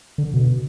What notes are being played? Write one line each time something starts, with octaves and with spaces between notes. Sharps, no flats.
D3
B2